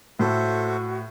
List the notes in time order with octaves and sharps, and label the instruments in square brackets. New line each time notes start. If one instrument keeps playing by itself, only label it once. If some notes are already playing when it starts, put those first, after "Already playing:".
[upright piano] A2 [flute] F#4 [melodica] A4 C5 E5